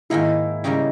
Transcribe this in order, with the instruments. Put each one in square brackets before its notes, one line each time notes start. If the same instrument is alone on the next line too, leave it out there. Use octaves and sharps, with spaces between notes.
[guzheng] G#2 D#3 A#3 D#4 [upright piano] E4
[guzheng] C#3 G3 A#3 D#4 A#4